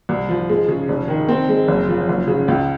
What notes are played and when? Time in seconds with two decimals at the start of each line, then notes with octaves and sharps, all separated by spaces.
0.09 C2
0.29 F3
0.49 G#3
0.68 C#3
0.89 F1
1.08 D#3
1.28 C4
1.49 G#3
1.68 F#1
1.88 F3
2.09 F#1
2.27 C#3
2.48 C#2